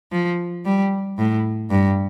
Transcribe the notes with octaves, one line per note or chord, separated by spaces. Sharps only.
F3
G3
A2
G2